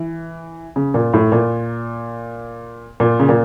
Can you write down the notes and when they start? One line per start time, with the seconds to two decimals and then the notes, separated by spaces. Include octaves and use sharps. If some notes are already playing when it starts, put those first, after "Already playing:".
Already playing: E3
0.76 C#3
0.94 A#2
1.14 A2
1.32 A#2
3.00 A#2
3.20 C#3
3.29 A#2